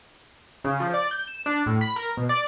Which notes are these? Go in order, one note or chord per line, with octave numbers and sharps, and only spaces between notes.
C#3
F3
D5
G6
E7
D4
A2
B5
A#4
B2
D5